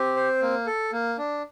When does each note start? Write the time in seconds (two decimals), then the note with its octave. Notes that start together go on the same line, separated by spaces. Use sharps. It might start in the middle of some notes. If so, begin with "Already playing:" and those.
Already playing: C4 G4
0.16 C5
0.42 A#3
0.66 A4
0.92 A#3
1.18 D4